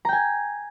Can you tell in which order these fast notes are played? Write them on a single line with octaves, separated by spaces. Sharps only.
A#5 G5 G#5